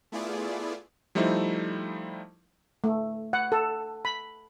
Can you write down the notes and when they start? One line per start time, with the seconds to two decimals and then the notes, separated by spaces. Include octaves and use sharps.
0.12 A3 B3 E4 F4 G#4 D5
1.15 F3 G3 A3 D#4 E4 C5
2.84 A3
3.33 F#5
3.52 A4
4.05 B5